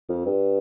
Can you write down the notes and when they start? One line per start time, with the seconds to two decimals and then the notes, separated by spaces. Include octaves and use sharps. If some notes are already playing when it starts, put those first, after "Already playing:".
0.09 F2
0.26 G2